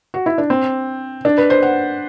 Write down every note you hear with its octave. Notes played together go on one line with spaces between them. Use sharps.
F#4
E4
D4
C4
D4
B4
C5
F#5